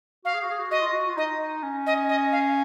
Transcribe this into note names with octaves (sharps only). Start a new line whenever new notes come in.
F#4 F5
G#4
F#4
G#4
F#4
F#4 D#5
F4
F#4
F4
D#4 D#5
C#4
D#5
D#5
F5